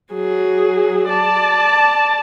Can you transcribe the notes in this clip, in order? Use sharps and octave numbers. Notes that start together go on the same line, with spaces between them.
F#3 G#4
D5 A5